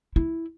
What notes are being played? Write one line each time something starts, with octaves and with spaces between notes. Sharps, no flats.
E4